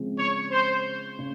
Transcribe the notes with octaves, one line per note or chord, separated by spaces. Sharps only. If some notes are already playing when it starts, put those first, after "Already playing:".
Already playing: C#3 F3 G#3 C4
C#5
C5
C#3